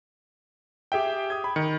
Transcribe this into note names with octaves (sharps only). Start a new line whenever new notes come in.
G4 G#4 E5 G5
D#6 G#6
B5
D#3 C#7